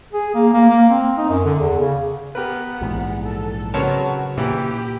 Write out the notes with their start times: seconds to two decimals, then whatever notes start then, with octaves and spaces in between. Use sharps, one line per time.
0.13 G#4
0.35 A#3
0.53 A#3
0.70 A#3
0.89 C4
1.17 D#4
1.29 F#2
1.44 D3
1.59 E2
1.81 C#3
2.35 B3 G4 A#4 B4 F#5
2.81 A#1 G#2 E3
3.23 A4
3.74 C#3 F#3 B3 C4 F#4 A#4 C#5 A5
4.38 A#2 E3 A#3 G4